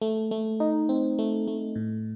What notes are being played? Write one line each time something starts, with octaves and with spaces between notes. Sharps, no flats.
A3
A3
D#4
C4
A3
A3
A2